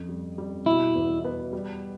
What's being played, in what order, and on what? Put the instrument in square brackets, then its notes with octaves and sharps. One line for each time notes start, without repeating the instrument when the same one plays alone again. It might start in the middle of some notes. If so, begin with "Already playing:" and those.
Already playing: [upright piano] F2 C#3
G3
G3
[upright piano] B2 [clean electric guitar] E4
[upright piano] E2
B3
G3